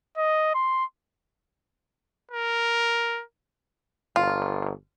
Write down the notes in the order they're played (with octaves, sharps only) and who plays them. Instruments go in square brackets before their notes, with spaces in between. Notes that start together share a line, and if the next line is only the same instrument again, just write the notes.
[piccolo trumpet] D#5
C6
[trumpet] A#4
[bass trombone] G1 [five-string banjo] F4